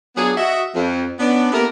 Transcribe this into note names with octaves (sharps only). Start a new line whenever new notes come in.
F#3 B3 D4 F4 G#4
F#4 D#5 E5
F2
B3 C#4 D4
A#3 B3 E4 G4 A4 A#4